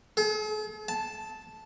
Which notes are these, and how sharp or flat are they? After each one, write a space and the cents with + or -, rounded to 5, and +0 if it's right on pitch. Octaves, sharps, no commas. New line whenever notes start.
G#4 +45
A5 -5